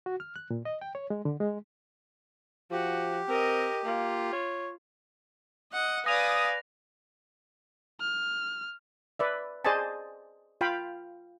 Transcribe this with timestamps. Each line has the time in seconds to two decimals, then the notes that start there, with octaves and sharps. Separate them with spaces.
0.06 F#4
0.20 F6
0.36 F#6
0.50 A#2
0.65 D#5
0.81 G5
0.95 C#5
1.10 G#3
1.25 D3
1.40 G#3
2.71 F3 F#4 G4
3.29 C4 A#4 D#5
3.85 A#3 F4
4.33 C#5
5.73 D#5 F#5
6.06 B4 D5 F5 G#5 D#6 A#6 F7
8.00 F6
9.19 B4 D5 E5
9.65 G#4 C5 D5 D#5 G#5 A5
10.61 F4 F5 G5 B5